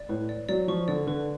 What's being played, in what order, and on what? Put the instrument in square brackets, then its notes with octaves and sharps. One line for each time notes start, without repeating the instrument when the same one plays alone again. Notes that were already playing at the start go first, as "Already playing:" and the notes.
Already playing: [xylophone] D5
[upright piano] A2 [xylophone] B4
[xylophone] D5
[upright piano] F#3 [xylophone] D5
[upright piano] F3 [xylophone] C#6
[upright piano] D3 [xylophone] D5
[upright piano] D3 [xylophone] B4